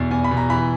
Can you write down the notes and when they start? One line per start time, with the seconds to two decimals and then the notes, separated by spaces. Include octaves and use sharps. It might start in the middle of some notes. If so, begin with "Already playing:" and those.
Already playing: E2 B2
0.11 E2 G#5
0.24 B5
0.31 B2
0.37 A#5
0.50 E3 B5